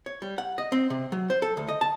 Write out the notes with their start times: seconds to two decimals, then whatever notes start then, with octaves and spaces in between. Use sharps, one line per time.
0.06 C#5
0.22 G3
0.38 F#5
0.58 D#5
0.72 C4
0.90 C3
1.12 F#3
1.30 C5
1.42 A4
1.57 D2
1.68 D#5
1.81 A5